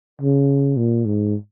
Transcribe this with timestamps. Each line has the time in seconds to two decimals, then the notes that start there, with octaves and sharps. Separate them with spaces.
0.22 C#3
0.77 A#2
1.06 G#2